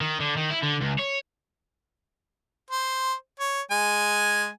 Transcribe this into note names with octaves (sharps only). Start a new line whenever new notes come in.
D#3
D3
D#3
E4
D3
C#2
C#5
C5
C#5
G#3 G#5